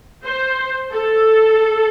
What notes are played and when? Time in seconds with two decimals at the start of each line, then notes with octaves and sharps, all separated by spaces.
0.24 C5
0.92 A4